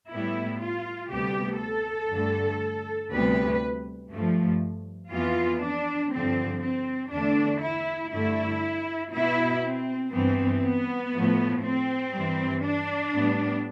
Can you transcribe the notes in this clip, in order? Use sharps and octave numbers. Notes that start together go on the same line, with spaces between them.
A2 G3 B3 E4
F4
D2 C3 G3 B3 G4
A4
G2 D3 A3
D2 C3 G3 B3 B4
G2 F3 A3
F2 E3 B3 F4
D4
G2 D3 F3 C4
C4
E2 D3 A3 D4
E4
G2 D3 A3 E4
B2 B3 E4
C4
G2 E3 B3 C4
B3
A2 F3 A3
C4
G2 E3 G3
D4
A2 G3 B3